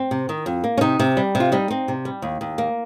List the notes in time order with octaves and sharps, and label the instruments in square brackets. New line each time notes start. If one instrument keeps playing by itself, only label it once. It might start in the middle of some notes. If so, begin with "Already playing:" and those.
Already playing: [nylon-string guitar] C4
C3
D#3
F2
A#3
C#4
C3 D#4
C3
G3
C3
F4
G3 D#4
C4
C3
G3
D#2
D#2
A#3